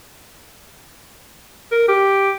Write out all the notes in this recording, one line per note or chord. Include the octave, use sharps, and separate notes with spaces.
A#4
G4